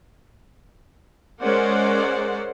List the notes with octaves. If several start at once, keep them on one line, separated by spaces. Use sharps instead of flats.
G#3 C#4 A#4 C5 D5 F#5